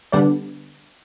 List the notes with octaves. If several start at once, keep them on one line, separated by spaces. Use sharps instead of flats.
D3 G3 B3 D4 D5 F#5